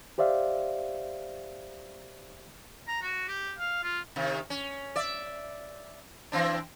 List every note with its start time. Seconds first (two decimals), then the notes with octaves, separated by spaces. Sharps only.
0.18 G4 C5 D5 E5 F5
2.87 A#5
3.02 F#4
3.28 G4
3.59 F5
3.83 F4
4.16 C3 D#3
4.50 C#4
4.96 D5 E5
6.32 E3 C4 D4